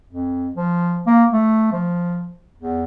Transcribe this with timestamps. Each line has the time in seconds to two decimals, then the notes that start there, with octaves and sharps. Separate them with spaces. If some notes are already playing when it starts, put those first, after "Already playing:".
0.07 F2
0.56 F3
1.07 A#3
1.33 A3
1.73 F3
2.58 E2